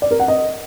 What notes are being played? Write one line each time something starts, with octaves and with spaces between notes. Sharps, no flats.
D5
A#4
F#5
D#5